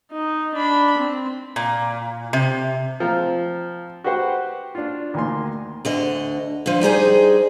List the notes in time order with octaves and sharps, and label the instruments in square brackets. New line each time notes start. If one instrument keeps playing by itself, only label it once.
[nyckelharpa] D#4
D4 B5
C4
[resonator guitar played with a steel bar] A#2
C3
[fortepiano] F3 C4 A#5
F#4 G4 B4 C5 F#5 G5
D4 F4
D2 D#3 A#3 G#5 C6
[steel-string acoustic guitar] D2 D3 D#5
D3 F3
G3 D#4 G#4 C5